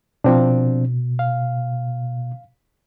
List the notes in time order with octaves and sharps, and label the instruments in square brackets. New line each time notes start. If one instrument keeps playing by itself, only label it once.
[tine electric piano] B2 [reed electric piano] F3 C4 D4
[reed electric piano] F5